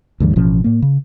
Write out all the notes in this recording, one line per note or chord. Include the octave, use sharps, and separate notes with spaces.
D2 G2 E3
A1 B2 F3 C#4
A2 A#3
C#3